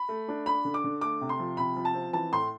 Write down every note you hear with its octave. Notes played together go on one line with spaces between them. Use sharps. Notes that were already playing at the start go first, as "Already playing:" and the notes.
Already playing: B5
A3
D4
D4 B5
D3
D6
D3
A3 D6
C3
C6
F3
C3 B5
F3
A5
C4
E3 A5
A2 C6